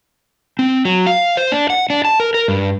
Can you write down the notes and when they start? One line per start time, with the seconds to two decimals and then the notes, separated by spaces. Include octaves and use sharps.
0.59 C4
0.85 F#3
1.07 F5
1.37 C5
1.52 D4
1.70 F#5
1.90 D4
2.05 A5
2.20 A#4
2.34 A#4
2.48 G2